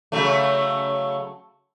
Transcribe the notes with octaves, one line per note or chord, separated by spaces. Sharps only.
C#3 F#3 A3